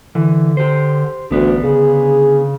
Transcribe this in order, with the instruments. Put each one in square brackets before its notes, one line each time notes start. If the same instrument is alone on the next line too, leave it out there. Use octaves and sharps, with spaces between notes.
[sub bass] D3 [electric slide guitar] E3
[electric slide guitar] G4 C5
[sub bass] A1 [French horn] D2 [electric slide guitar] D3 B3 D4
[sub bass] C#3 [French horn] G#4